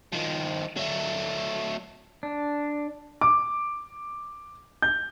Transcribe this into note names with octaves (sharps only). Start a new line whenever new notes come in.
D#3 F3
F#3 A3
D4
D6
G6